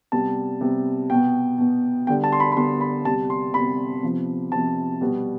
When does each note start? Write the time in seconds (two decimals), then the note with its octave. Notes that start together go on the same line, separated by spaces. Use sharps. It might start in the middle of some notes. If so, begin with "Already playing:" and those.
0.12 C3 G3 B3 A5
0.61 C3 G3 B3
1.10 B2 B3 G5
1.58 B2 B3
2.07 D3 G3 B3 G5
2.24 A5
2.32 C6
2.40 B5
2.52 B5
2.56 D3 G3 B3 C6
2.81 B5
3.05 C3 G3 B3 A5
3.30 C6
3.54 C3 G3 B3 B5
4.02 C3 F3 B3
4.52 C3 F3 B3 A5
5.01 B2 G3 B3